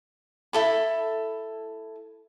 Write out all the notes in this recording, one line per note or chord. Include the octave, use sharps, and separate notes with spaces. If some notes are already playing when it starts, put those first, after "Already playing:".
E4 A4 B5